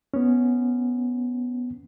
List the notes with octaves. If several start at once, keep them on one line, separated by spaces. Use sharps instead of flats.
B3 C#4